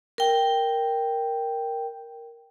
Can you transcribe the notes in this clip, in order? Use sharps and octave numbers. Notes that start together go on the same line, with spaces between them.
A#4 G5